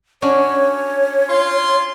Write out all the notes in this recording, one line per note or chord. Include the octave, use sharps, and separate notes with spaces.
C#4 D4 F#4 C#5
F4 C6